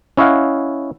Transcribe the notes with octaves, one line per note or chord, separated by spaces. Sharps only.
C#4 E4 C#5 D#5 F5 F#5